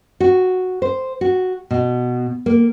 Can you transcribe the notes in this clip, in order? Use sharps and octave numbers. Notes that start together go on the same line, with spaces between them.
F#4
C5
F#4
B2
A#3